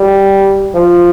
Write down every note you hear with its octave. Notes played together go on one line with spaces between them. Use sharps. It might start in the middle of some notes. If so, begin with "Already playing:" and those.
Already playing: G3
F3